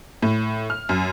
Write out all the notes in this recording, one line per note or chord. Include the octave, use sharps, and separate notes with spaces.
A2
F6
F#2